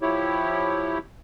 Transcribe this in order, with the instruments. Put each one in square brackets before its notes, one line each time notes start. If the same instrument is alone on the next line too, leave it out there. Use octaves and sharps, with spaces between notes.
[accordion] F3 E4 G4 C#5